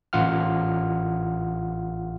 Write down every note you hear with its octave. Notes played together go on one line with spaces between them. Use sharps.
A1 F4 F#5 F6